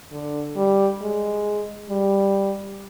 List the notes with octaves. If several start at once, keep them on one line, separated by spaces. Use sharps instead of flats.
D3
G3
G#3
G3